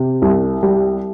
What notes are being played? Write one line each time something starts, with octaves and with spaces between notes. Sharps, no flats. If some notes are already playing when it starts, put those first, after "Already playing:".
Already playing: C3
C2
G3